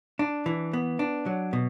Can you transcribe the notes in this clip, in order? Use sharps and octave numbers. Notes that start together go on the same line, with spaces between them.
D4
E3
B3
D4
F#3
B2